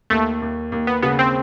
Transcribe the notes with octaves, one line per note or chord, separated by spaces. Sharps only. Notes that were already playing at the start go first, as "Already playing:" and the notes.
D#2 A3
D#2
D#2
B3
C#3 B3
C4